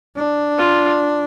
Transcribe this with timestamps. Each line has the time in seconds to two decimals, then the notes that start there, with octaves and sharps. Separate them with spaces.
0.16 D4
0.58 F4